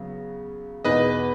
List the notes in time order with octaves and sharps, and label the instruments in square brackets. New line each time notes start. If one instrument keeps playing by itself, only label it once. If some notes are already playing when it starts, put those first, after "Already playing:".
Already playing: [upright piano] C#3 F#3 B3
[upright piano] E2 B2 G#3 B3 D#4 [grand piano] B4 D#5